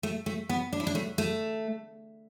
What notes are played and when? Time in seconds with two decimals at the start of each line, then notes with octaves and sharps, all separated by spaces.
0.03 A3
0.26 A3
0.49 B3
0.73 D4
0.80 E4
0.87 D4
0.95 A3
1.18 A3